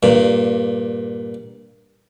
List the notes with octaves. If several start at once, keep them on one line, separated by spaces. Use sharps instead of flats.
G2 A#2